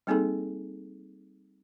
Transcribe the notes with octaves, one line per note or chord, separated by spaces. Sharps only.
G3 A#3 C4 D#4 G#4 A4